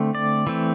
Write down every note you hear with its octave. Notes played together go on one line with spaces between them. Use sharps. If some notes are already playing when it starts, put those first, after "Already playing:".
Already playing: D3 A3 C4
D5
E3 A3 C4